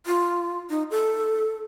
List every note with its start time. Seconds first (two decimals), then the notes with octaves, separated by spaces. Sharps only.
0.06 F4
0.70 D#4
0.91 A4